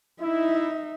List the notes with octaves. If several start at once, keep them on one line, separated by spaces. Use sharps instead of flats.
D#4 E4 E5